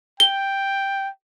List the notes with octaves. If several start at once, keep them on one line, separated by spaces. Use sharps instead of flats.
G5 G7